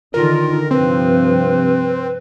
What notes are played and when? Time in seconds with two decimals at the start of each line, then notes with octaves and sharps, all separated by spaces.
0.14 D3 D#3 F4 A#4
0.71 G2 C3 F3 C4 B4